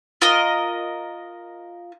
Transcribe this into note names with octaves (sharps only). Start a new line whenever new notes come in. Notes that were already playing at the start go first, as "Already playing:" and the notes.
F4 A#4 D#5